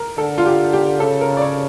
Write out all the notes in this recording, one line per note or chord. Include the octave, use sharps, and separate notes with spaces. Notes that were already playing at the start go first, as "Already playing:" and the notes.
Already playing: A#4
D3 A4
F4
G4
G4
C#3 A4
A#4
D5
C#5